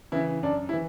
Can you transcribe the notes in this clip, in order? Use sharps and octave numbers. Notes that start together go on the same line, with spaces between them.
C#3 E3 E4
F#2 D4
E4
E3